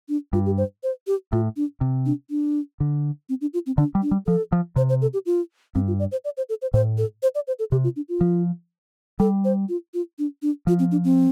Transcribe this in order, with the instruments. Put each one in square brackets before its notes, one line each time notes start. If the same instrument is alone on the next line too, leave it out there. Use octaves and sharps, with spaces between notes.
[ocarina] D4
[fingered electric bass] G2 [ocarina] F4
[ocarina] G4
C5
C5
G4
[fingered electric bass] A2 [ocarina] F4
[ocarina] D4
[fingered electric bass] C3
[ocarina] D4
D4
[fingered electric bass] D3
[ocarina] C4
D4
F4
C4
[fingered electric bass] D3 [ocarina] D4
[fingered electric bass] G3
[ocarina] D4
[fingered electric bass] G3
[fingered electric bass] F3 [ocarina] A4
[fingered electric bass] F3
[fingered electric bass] C3 [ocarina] C5
[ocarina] C5
A4
G4
F4
[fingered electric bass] G2 [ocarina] C4
[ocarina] F4
D5
C5
D5
C5
A4
C5
[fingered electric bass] A2 [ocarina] C5
[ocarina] A4
C5
D5
C5
A4
[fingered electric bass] C3 [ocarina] G4
[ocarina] F4
D4
F4
[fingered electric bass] F3
[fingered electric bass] G3 [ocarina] A4
[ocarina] C5
F4
F4
D4
D4
[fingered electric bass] F3 [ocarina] F4
[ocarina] C4
D4
C4